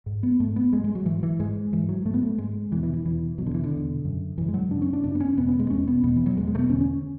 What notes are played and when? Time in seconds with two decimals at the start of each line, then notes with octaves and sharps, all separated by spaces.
0.06 G#2
0.23 B3
0.40 G#2 A3
0.56 B3
0.73 G#2 G#3
0.84 G#3
0.95 F#3
1.06 G#2 E3
1.23 E3
1.39 G#2 G#3
1.72 G#2 E3
1.89 F#3
2.05 G#2 A3
2.14 B3
2.22 A3
2.38 G#2 G#3
2.71 E2 B2 E3
2.83 E3
2.93 E3
3.05 E2 B2 E3
3.38 B2 F#3
3.42 E2 D3
3.54 E3
3.64 D3
3.71 E2 B2
4.05 F#2 C#3
4.37 F#2 C#3 E3
4.48 G#3
4.54 F#3
4.70 F#2 C#3 D4
4.82 C#4
4.93 D4
5.04 F#2 C#3 D4
5.15 B3
5.20 C#4
5.37 E2 B2 B3
5.48 B3
5.59 G#3
5.70 E2 B2 C#4
5.87 B3
6.03 E2 B2 B3
6.16 E3
6.26 F#3
6.37 E2 B2 G#3
6.47 G#3
6.55 A3
6.59 B3
6.69 E2 D3 C#4
6.81 C#4